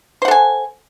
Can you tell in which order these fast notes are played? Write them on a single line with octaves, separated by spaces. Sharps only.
C5 F#5 A4 G#5